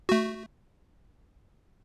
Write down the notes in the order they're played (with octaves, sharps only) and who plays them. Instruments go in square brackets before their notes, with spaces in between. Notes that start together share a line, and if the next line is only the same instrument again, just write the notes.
[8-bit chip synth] A3 F#4